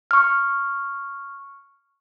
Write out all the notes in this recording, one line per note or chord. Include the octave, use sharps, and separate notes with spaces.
C#6 F6